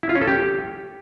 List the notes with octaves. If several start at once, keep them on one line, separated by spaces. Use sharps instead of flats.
E4
F4
C#4
A4
G4